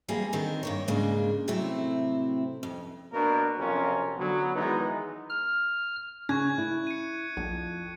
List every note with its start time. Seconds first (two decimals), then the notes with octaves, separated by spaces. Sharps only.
0.08 E2 G3 A#3 C4 G#4
0.33 D3 D#3 C4 A#4
0.63 G2 A#3 C#5
0.88 G#2 C#3 G#3 A#3 D4
1.48 A2 C3 F#3 A3 C4 E4
2.63 F2
3.13 B2 A#3 D4 F#4 A#4
3.57 B1 F2 C3 C#4 F4 A#4
4.17 D3 F#3 B3
4.55 D#3 E3 G#3 B3 D#4
5.30 F6
6.29 C#3 C#4 C#6 F#6 G#6
6.58 E4
6.87 C#7 D#7
7.37 A#1 F2